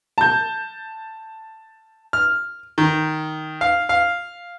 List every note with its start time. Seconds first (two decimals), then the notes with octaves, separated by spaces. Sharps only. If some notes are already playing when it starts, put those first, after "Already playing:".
0.18 A5 G6
2.13 F6
2.78 D#3
3.61 F5
3.89 F5